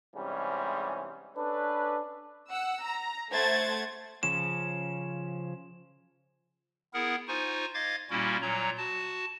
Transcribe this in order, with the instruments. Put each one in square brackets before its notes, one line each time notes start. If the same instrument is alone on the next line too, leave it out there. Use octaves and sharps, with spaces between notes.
[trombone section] G#2 C3 E3 G3 G#3 C#4
C#4 D4 A4 B4
[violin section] F#5 E6
A#5
A3 C5 F#5 G#6 A6
[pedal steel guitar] C#3 F3 C#4 [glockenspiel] E7
[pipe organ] B3 E4 G#4 A#4 F#5
D#4 F4 C5 G#5 C#6
D#5 F5 D6 G#6 A6
A#2 G3 A#3 C#4 E4 F#4
A#2 F#3 C#5 A#5
F#4 A5